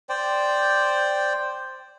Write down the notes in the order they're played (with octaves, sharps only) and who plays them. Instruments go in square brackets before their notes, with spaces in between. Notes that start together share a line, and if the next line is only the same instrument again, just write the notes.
[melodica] C5 D5 G5